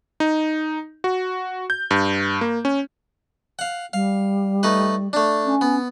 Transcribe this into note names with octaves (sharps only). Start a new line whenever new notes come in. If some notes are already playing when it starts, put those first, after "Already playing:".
D#4
F#4
G6
G2
A#3
C#4
F5 F#5
G3 F5
A3 D#4 B4
A3 D4
C#4
B3